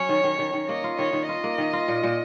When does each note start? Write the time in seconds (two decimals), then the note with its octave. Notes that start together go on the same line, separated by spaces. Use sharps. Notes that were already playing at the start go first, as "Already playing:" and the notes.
Already playing: F#3 C#4 C#5
0.09 D#3
0.24 D#3
0.39 D#3
0.53 D#3
0.68 A#3 D#5
0.84 F4
0.98 D#3 C#5
1.13 D#3
1.28 F4 D#5
1.44 A#3
1.58 D#3
1.73 F4
1.88 A#2
2.03 A#2